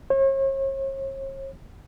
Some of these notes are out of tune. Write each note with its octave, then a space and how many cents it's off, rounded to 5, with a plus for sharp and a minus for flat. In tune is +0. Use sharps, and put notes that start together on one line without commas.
C#5 -40